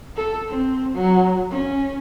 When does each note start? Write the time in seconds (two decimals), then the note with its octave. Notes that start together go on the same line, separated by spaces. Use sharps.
0.17 A4
0.49 C4
0.95 F#3
1.51 C#4